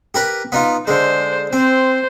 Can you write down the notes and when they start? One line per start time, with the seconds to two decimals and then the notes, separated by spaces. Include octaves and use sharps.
0.14 G4 A#4 B4
0.52 B3 D#4 F4
0.87 D3 G#3 C5
1.53 C4 C5